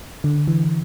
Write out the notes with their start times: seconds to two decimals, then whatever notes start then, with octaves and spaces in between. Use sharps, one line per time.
0.24 D3
0.48 E3